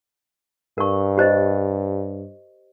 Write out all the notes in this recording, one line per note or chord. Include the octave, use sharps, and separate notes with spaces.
G2 A#4 C#6
G4 C5 D#5